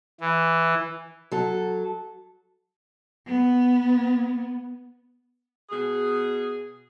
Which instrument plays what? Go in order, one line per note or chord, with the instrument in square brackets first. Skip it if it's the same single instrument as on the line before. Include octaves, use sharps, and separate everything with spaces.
[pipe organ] E3
[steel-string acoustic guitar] F#3 A4
[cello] B3
[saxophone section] B2 G#4